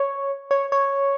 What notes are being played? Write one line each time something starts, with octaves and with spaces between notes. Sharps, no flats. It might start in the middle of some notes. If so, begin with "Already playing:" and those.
Already playing: C#5
C#5
C#5